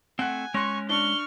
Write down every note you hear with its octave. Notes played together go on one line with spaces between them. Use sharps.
A3 C4 F#5 G#5 F#6
G#3 C#4 C#5 C6 C#6 F#6 A#6
D4 C#6 F6 G7